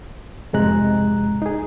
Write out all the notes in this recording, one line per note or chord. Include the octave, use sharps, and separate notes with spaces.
F2 G#2 C3 G#3 A#5 F#6
D#4 G#4